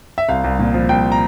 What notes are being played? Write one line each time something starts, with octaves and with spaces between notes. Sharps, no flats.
E5
C2 F5
C2
A#2
F3
C2 G5
A#5